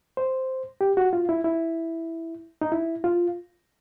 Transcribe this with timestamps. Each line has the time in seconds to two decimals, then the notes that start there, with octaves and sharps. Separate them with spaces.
0.17 C5
0.81 G4
0.97 F#4
1.13 F4
1.29 E4
1.44 E4
2.61 D#4
2.72 E4
3.04 F4